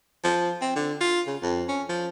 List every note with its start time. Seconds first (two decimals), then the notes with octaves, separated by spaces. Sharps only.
0.24 F3
0.61 C4
0.75 D3
1.01 F4
1.27 C#3
1.42 F2
1.68 C#4
1.89 F3